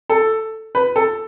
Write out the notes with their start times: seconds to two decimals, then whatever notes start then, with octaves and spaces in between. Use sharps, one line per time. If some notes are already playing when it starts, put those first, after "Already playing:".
0.09 A4
0.75 B4
0.96 A4